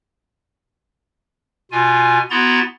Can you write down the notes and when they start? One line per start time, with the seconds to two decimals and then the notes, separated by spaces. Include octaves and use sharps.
1.71 B2 F4 G#5
2.30 B3 E4 F#4 A#5 C6 A6